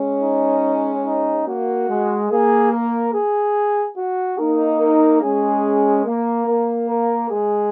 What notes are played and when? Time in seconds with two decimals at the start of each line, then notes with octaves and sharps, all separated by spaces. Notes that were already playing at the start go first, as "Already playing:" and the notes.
Already playing: G#3 C#4
0.22 D#4
1.05 D#4
1.47 A#3 F#4
1.89 G#3
2.30 A#3 G#4
2.72 A#4
3.13 G#4
3.97 F#4
4.38 A#3 D#4 A#4
4.80 A#4
5.21 G#3 C#4 G#4
6.05 A#3 A#4
6.47 A#3
6.88 A#4
7.30 G#3 G#4